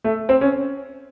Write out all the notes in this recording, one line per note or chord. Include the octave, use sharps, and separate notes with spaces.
A3
C4
C#4